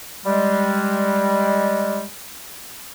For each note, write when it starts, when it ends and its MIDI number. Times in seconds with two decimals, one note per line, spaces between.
0.25 2.05 55
0.25 2.05 56